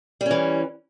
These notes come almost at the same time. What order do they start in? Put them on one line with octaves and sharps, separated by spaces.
G3 C#4 E3